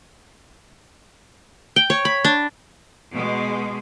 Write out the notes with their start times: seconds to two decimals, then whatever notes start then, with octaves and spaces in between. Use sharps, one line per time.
1.76 G5
1.90 C#5
2.05 B5
2.25 D4
3.13 B2 G#3